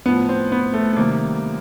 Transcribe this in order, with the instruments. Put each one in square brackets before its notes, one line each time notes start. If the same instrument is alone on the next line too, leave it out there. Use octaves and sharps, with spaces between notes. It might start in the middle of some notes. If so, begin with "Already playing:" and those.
[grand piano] A2 F3 B3
C4
B3
A3
A3
C3 D#3 G3 A#3